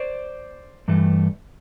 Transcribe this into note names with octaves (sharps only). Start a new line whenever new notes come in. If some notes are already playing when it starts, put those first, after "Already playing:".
Already playing: C5 D5
G2 E3 A3